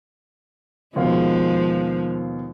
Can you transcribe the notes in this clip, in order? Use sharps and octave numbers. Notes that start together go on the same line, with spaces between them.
D#2 B2 F3 G#3 F5